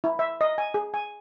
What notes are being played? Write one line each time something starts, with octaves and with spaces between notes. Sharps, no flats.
E4
E5
D#5
G#5
G#4
G#5